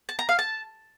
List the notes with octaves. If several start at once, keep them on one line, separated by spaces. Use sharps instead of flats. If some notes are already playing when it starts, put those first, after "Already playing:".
A5
A#5
F5
A5